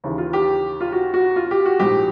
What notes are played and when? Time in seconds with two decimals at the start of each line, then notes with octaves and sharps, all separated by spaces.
0.04 D#2 C#3 E3
0.18 F4
0.33 G4
0.81 F4
0.92 F#4
1.14 F#4
1.36 F4
1.51 G4
1.66 F#4
1.79 A#1 G#2 F3 G4